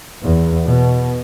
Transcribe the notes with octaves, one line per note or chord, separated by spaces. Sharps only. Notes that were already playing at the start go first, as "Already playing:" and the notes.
E2
B2